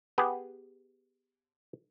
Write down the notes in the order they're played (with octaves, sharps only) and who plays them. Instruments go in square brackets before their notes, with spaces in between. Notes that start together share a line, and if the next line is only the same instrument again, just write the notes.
[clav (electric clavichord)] B3 G4 G#4 B4